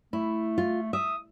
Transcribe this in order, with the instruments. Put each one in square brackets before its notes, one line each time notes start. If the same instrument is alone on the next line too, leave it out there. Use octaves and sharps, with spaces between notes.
[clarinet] A3 [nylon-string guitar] E4
[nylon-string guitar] F4
[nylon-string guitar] E5 [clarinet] D#6